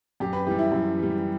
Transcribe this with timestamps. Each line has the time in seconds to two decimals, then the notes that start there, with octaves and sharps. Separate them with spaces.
0.20 F#2 G4
0.33 B4
0.47 E3 G3 G4
0.59 E4
0.72 F#2
0.98 E3 G3